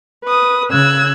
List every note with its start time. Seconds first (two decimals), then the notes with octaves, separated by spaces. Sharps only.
0.23 B4 D#6
0.70 C#3 E6 F#6 G#6